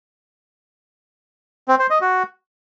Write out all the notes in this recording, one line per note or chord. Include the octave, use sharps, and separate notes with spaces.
C4
C5
D#5
F#4